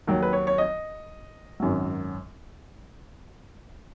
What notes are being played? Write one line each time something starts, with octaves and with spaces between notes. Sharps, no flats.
D#2 D#3 F#3
B4
C#5
C#5
D#5
G#1 F#2 D#3 F#3